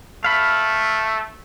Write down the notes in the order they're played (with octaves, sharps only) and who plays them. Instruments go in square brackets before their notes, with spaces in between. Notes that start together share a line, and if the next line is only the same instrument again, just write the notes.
[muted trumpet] A3 [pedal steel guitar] F5 B5